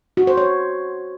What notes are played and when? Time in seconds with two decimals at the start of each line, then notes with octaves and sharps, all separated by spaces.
0.17 F#4
0.27 C5
0.37 C#5